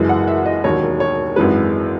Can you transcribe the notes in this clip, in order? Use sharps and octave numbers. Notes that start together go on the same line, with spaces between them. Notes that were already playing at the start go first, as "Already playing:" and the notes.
Already playing: F#1 F#2 E3 G#3
F#5
E5
D#5
E1 D#2 D#3 F#3 C#5
C#5
G#1 F#2 E3 G#3 B4